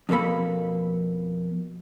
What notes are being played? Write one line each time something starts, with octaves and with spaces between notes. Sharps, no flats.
F2 B2 A#3 A4 B5